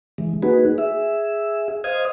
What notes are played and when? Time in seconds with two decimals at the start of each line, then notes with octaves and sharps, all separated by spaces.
0.18 E3 G#3
0.42 A#3 D#4 F#4 G#4 B4
0.78 G#4 E5
1.84 C5 D#5 F5 D#6 G#6